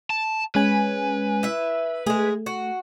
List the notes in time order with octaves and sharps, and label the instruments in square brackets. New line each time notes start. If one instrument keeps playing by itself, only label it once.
[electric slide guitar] A5
[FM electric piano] G#3 C#4 G#5 [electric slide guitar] B4
[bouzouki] E4 E5
[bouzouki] G#3 G#4 [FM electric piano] A3
[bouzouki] F#4